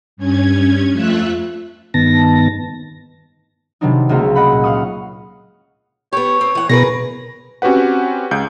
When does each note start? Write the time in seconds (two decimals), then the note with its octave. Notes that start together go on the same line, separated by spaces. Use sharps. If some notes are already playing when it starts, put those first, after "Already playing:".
0.17 G2 C#4 G#6
0.92 F2 A3 F4 E5 F#6
1.94 G2 D#3 B3 A5 A#6
3.81 C3 D#3 F#3 B3 D4 D#4
4.09 C#2 A3 A#3 F4 F#4 A#5
4.35 D#5 F#5 B5
4.52 A#2
4.64 F5 F#5 C#6 D#6
6.13 B3 G4 C#5
6.41 C4
6.55 E3 F#5
6.69 B2 G#4 A#4 B4 A#6
7.62 C4 C#4 F#4 G4 B4 F#5
8.31 C#2 G6